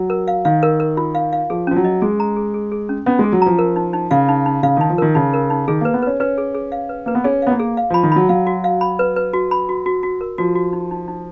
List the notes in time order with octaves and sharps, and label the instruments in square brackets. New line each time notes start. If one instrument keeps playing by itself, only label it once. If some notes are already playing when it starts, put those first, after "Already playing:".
Already playing: [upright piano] F#3
[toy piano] A#4
F5
[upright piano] D#3 [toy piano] F5
[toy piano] A#4
A#4
F4
F5
F5
[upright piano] F3 [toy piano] G#4
[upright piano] F3 [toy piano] C#4
[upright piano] F#3
[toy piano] D#5
[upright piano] G#3 [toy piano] G#4
[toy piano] A#5
G#4
G#4
G#4
C#4
[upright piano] B3 [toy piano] C#4
[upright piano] G#3 [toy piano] G#4
[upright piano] F#3
[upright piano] F3 [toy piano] A#5
[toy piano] A#4
D#4
D#4
[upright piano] C#3 [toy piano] F5
[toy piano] D#4
D#4
[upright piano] C#3 [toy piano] F5
[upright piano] D#3 [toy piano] D#4
[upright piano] F3
[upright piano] D#3 [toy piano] A#4
[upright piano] C#3 [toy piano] D#4
[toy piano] A#4
D#4
[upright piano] D#3 [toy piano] G#4
[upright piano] A#3 [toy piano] B4
[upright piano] B3
[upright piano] C#4 [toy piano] B4
[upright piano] C#4 [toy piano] B4
[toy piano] G#4
G#4
F5
B4
[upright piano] A#3 [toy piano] B4
[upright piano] B3
[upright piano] C#4 [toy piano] G#4
[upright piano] B3 [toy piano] F5
[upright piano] A#3
[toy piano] G#4
F5
[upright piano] F3 [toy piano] B5
[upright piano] D#3
[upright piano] F#3 [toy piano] B5
[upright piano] F#3 [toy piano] F5
[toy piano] F#4
F5
B5
B4
B4
F#4
B5
F#4
F#4
F#4
A#4
[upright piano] F3 [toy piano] F#4
[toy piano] F#4
D#4
D#4
D#4